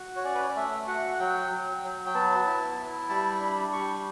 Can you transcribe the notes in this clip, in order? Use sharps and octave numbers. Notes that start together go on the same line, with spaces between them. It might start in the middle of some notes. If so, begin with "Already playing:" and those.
Already playing: F#4
C#5
C#4 D5
B4
C#5
D5
A3 E5
F#4 F#5
F#5
F#3 G5
F#3
F#3
G5
B3 A5
E4
E4
G3 A5
D4 B5
G3 C#6